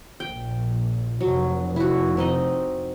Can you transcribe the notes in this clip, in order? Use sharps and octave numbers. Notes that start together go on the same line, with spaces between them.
A#1 G5
F1 F#3
E4 F#4
C4 D#4 D#5